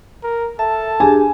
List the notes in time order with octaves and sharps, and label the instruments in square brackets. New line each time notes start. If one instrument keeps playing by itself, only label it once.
[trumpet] A#4
[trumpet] A4 [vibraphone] E5 [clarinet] A5
[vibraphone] D4 G4 G#4 [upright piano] G#5